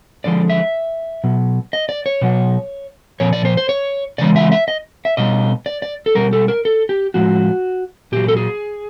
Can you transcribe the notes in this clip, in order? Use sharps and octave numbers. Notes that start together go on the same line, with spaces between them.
D3 F3 G#3 D5
E5
B2 F#3
D#5
D5
C#5
B2 F#3
A#2 F3 C#5
D5
C5
C5
C#5
C#3 E3 G#3 D5
E5
E5
D#5
E5
B2 G3 D#5
D5
D5
A4
B2 G3 A#4
A4
A#4
A4
G4
A2 F3 G#3 F#4
A#2 F#3 G4
A4
G#4